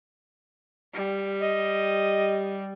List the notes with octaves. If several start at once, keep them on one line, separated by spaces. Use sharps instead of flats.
G3
D#5